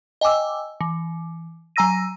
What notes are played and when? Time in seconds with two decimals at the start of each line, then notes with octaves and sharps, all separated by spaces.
0.21 D#5 G5 G#5 D6 E6
0.81 E3
1.76 F#3 G#5 A#5 E6 A#6 D#7